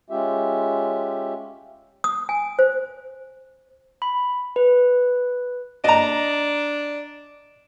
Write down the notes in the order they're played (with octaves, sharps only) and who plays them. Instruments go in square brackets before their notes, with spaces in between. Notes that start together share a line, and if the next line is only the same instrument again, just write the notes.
[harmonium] G#3 C#4 F4 G4 E5
[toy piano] D#6
G#5
C5
[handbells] B5
B4
[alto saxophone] D4 [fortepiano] D#5 A#5